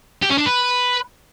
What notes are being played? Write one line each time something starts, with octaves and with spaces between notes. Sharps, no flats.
G4
C#4
D4
B4